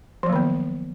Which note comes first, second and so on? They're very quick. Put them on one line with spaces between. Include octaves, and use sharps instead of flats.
F3 F#3 A#3 D#3 B3